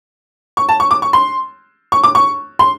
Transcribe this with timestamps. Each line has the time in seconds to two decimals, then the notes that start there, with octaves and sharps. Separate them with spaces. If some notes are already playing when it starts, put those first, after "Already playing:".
0.57 C#6
0.69 A5
0.80 C#6
0.91 D6
1.02 C#6
1.13 C6
1.92 C#6
2.03 D6
2.15 C#6
2.59 C6